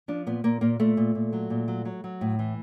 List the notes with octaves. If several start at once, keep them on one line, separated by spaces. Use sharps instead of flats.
F3 D4
A#2 B3
A#2 A#3
A#2 A#3
A#2 A3
A#2
A#2
F#3
A#2
F#3
F#3
F#3
A2
E3